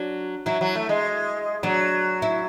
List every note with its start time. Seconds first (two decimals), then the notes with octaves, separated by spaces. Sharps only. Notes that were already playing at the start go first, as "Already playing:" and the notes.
Already playing: F#3 D4
0.46 F#3 E4
0.61 F#3
0.75 A3
0.89 G#3
1.63 F#3 D4
2.22 E4